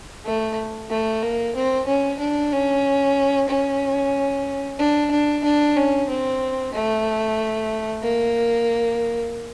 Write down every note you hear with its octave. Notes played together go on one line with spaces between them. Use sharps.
A3
A3
A#3
C4
C#4
D4
C#4
C#4
D4
D4
D4
C#4
C4
A3
A#3